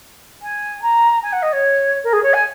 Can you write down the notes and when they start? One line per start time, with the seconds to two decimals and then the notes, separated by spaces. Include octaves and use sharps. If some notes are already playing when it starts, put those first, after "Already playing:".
0.42 G#5
0.82 A#5
1.23 G#5
1.33 F#5
1.42 D#5
1.52 C#5
2.04 A#4
2.13 G#4
2.23 C#5
2.33 G#5